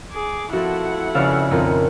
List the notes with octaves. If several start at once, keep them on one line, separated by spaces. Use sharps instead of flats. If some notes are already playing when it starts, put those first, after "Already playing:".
G#4 D6
F3 A3 C4 E4 F#4 F#5
F2 C#3 B4 D5 F5 E6
F2 A#2 D#3 D#4 F4